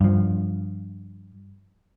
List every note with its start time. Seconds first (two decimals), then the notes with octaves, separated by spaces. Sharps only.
0.01 G2 F3